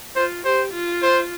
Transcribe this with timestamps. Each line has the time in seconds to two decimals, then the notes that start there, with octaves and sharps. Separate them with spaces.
0.16 F4 C5
0.44 G4 C5
0.73 F4
1.02 C5